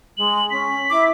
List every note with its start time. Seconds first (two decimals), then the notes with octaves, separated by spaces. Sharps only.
0.17 G#3 F#7
0.50 C#4 B6
0.90 E4 D6